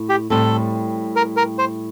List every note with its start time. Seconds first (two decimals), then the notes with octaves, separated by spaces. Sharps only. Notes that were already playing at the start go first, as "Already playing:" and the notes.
Already playing: A2
0.09 G4
0.30 A2 G3 C4 A4
1.16 A#4
1.37 A#4
1.59 C5